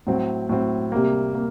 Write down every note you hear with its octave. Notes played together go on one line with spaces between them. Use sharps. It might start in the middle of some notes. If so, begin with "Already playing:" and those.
A2 F#3 C4
A2 F#3 C4
C3 G3 A#3
A#3